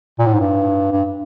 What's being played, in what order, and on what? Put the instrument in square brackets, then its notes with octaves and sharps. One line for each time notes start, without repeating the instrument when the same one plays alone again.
[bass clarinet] A#2
A2
G#2
G2
G2